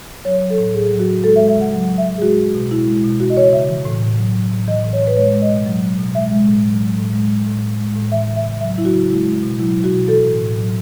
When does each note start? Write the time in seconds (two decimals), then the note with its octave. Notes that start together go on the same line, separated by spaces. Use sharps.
0.25 F#3 C#5
0.42 F#3
0.50 A4
0.58 A2
0.74 F#3 G#4
0.91 F#3
0.99 F#4
1.07 C#3
1.23 G#3 A4
1.36 E5
1.40 G#3
1.49 E5
1.56 C#3 F#5
1.73 F#3 F#5
1.89 F#3
1.98 E5
2.06 A2
2.18 G#4
2.21 G#3 F#4
2.38 G#3
2.55 B2
2.71 G#3 E4
2.87 G#3
2.96 E4
3.04 B2
3.20 E3 F#4
3.30 D#5
3.37 C#3 C#5
3.53 C#3 E5
3.69 E3
3.85 A2
4.02 A2
4.18 F#3
4.35 F#3
4.51 A2
4.68 E3 D#5
4.84 A2
4.93 C#5
5.01 A2
5.07 B4
5.16 G#3 C#5
5.33 G#3
5.42 D#5
5.50 B2
5.66 F#3
5.83 F#3
5.99 B2
6.15 G#3 E5
6.32 G#3
6.48 A2
6.65 F#3
6.81 F#3
6.98 A2
7.13 G#3
7.29 G#3
7.46 A2
7.63 G#3
7.79 G#3
7.96 A2
8.12 E3 E5
8.28 C#3
8.36 E5
8.44 C#3
8.61 F#3 E5
8.78 F#3 E4
8.85 F#4
8.94 C#3
9.10 G#3 E4
9.26 G#3
9.43 B2
9.59 F#3 E4
9.76 F#3
9.84 F#4
9.92 B2
10.08 E3 A4
10.25 A2
10.41 A2
10.58 F#3